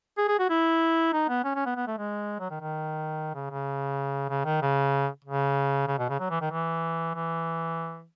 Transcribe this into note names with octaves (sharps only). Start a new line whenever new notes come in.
G#4
G#4
F#4
E4
D#4
B3
C#4
C#4
B3
B3
A3
G#3
F#3
D#3
D#3
C#3
C#3
C#3
D#3
C#3
C#3
C#3
B2
C#3
F#3
E3
D#3
E3
E3